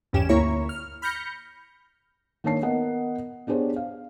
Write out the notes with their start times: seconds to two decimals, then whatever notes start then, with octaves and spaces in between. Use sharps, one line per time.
0.13 G#1 E2 G2 C#4 G4 E7
0.29 D2 A#3 E4 C#5 A#5 C#6
0.69 F6
1.02 B5 F6 G6 A#6 C#7
2.44 D#3 A#3 D4 C#5 A5 C7
2.62 B3 A#4 D#5 F#5
3.47 B3 D4 G4 G#4 C5 C#5
3.76 F5